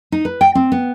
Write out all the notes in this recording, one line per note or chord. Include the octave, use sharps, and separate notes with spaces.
D#4
B4
G5
C4
B3